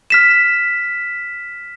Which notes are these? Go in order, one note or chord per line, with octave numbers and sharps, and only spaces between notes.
F6 B6 E7